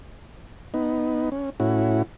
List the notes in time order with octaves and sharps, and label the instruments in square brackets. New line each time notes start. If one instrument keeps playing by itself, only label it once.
[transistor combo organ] B3 D#4
C#4
A2 C#4 E4 F#4